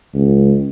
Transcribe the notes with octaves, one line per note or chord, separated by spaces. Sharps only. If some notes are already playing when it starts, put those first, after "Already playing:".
C#2